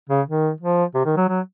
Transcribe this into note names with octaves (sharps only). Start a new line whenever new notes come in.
C#3
D#3
F3
C3
D#3
F#3
F#3